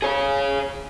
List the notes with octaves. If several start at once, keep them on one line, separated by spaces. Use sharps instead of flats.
G#4 C#5